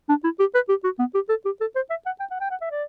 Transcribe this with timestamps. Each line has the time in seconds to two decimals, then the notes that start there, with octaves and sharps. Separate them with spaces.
0.09 D4
0.24 E4
0.40 G4
0.54 B4
0.69 G4
0.84 F#4
0.99 B3
1.15 G4
1.29 A4
1.45 G4
1.61 A4
1.76 C5
1.90 E5
2.06 F#5
2.20 G5
2.31 F#5
2.41 G5
2.50 F#5
2.61 E5
2.71 D5